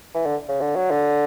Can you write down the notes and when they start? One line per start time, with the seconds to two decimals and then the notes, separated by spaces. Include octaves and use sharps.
0.14 E3
0.25 D3
0.48 C#3
0.61 D3
0.76 F#3
0.91 D3